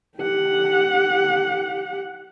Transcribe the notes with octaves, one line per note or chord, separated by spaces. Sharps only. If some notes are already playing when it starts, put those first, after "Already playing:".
G4 F#5